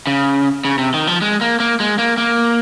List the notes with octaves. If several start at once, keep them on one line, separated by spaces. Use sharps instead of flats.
C#3
C#3
C3
D#3
F3
G#3
A#3
A#3
G#3
A#3
A#3